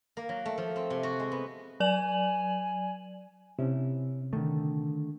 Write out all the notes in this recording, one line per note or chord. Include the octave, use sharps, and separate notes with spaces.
A#3
F#3
A3
F3
C4
C3
F#4
G#3
B3
F#3 D5 G#5 F#7
C3 C#4 E4
D3 D#3 A3